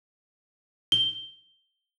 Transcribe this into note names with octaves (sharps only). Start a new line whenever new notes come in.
G7